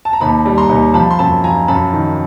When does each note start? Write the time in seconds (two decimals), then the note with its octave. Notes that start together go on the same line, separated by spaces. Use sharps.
0.05 A5
0.13 A#5
0.20 D#2 A5 B5
0.46 G3
0.58 A#5 C6
0.69 D#2
0.94 F3 A5 B5
1.11 C6
1.19 F#2 A5 B5
1.44 F3 G#5 A#5
1.68 F#2 A5 B5
1.93 D#3